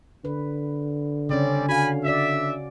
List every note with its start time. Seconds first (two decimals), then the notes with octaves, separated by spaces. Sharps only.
0.25 D3 B4
1.29 C#3 G3 C4 C#4 D5
1.69 F#4 F5 G#5 B5
2.04 F#4 D5 E5